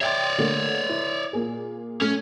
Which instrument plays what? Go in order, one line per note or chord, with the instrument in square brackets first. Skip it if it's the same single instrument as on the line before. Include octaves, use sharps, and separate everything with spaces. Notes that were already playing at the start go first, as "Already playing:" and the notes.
[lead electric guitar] C#5 D5 [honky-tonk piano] E5 G5 C6
[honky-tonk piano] D3 A3 A#3
E4
A#2 A#3 G#4
[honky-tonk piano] A3 [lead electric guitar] C#4